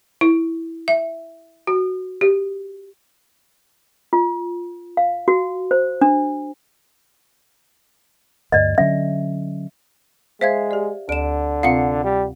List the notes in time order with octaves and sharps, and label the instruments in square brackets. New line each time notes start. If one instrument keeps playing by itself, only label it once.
[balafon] E4
E5
F#4
G4
[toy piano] F4
F5
F#4
C5
D4
[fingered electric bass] D2 G2 [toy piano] D5 D#5
[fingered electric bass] D3 F#3 C#4 [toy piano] E5
[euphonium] G#3 [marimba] C5 [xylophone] E5 F5 G#6
[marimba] G4 D5
[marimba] D2 [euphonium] D3 [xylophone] D7 E7
[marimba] C3 C4 F4 [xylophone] F5 F#5 C#7
[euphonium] G3